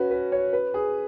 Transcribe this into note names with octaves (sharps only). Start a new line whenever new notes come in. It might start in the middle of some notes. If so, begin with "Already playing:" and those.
Already playing: C#4 F#4 B4
B4
C#5
B4
G#4